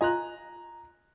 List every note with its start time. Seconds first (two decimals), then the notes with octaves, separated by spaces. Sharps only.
0.01 F4 D#5 G#5 A#5 F#6